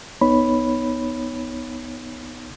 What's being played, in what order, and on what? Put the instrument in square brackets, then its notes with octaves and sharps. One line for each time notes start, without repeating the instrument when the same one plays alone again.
[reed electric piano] C2 B3 D#4 C#5 B5